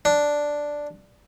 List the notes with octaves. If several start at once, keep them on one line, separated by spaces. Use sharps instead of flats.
D4